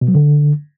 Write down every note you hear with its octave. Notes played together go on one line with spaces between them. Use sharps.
B2
F#3
D3